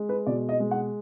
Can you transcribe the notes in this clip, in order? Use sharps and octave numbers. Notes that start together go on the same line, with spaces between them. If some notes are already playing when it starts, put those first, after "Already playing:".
Already playing: G#3
B4
B2 D5
D#5
G#3
F#5